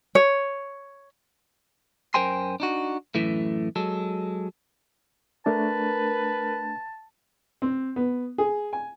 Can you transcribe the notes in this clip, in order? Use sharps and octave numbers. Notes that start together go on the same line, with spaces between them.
C#5
F#2 A#4 C5 G5 G#5 C6
D4 D#4 F#4
F#2 A2 E3 A3
F#3 G#3 A4
A3 D4 A#4 B4 A5
C4
B3
G#4
G#5